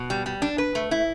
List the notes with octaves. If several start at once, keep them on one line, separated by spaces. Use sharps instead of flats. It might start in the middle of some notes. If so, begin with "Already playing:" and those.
Already playing: B2
G3
G3
D4
B4
A3
E4